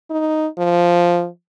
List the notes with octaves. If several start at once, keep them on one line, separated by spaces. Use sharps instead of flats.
D#4
F3